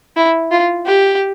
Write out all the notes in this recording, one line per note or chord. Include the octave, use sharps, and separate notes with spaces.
E4
F4
G4